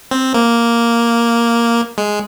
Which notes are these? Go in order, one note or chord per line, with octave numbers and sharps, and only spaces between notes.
C4
A#3
G#3